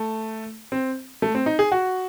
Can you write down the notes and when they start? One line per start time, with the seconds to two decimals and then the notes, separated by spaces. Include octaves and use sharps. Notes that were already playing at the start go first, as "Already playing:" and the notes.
Already playing: A3
0.72 C4
1.22 A3
1.35 C4
1.46 D#4
1.59 G#4
1.72 F#4